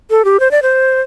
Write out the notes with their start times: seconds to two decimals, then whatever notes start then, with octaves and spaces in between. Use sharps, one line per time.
0.10 A4
0.25 G4
0.40 C5
0.51 D5
0.62 C5